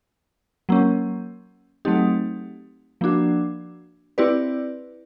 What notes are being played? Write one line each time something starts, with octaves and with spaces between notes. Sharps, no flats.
F#3 A#3 C#4
F#3 A3 C4 D#4 G4
F3 A#3 D4 F#4
C4 E4 G4 B4 D5